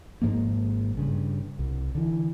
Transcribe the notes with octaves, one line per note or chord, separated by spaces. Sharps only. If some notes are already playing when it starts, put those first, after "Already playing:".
G#1 G#2 F3 A#3
G2 C#3
C2
D3 E3